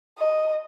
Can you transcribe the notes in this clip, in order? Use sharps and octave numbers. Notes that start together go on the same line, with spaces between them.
D#5